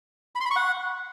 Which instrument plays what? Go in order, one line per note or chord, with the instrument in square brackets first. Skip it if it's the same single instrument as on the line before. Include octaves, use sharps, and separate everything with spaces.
[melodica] B5
C6
B5
C#6
F#5